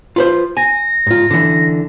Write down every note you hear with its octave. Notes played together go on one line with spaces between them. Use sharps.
F4 B4 C5
G#5 A#6
G#2 F4
D3 E3